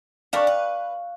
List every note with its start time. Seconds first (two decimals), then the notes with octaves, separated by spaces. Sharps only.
0.33 D4 G4 A#4 F5 C#6 F#6
0.47 B4